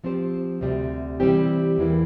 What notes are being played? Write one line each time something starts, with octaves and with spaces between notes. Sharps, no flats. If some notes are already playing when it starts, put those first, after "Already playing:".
F3 C4 G4 C5
D2 C3 G3
E3 G3 C4 G4
E2 E3 A#3